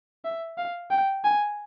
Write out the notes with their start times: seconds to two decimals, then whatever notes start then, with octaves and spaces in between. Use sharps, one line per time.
0.25 E5
0.58 F5
0.90 G5
1.24 G#5